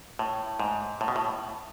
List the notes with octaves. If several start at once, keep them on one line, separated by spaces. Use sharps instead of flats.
A2
G#2
A2
B2
A2